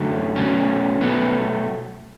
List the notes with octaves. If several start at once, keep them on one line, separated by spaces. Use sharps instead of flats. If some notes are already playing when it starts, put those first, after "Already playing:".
Already playing: F#2 D3 F#3 A3 C#4
B2 F#3 A3 C#4
B2 F#3 A3 B3